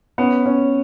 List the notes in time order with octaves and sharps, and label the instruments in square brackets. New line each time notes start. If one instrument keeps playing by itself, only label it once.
[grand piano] B3 [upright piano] C#4
[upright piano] C#4